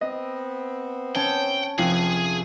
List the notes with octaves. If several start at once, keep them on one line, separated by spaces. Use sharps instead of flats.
B3 C4 D#5
C#4 G5 A5
F1 F2 F3 G#4 G5